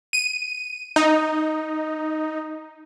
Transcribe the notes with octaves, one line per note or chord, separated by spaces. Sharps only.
D#7
D#4